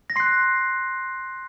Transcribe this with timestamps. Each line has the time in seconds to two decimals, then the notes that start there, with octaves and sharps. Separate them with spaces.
0.10 A#6
0.16 C6 F#6 C7